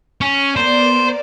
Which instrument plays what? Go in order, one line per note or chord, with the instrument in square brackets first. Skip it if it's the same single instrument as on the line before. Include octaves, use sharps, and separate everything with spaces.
[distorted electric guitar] C#4
[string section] B3 A#4 D5 [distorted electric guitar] C5